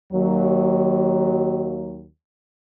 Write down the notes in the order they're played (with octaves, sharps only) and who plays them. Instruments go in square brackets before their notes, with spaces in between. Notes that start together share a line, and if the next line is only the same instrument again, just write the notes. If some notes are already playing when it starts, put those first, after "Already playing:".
[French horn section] D#2 F#3